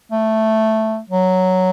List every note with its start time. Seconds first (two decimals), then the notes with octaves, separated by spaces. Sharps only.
0.11 A3
1.09 F#3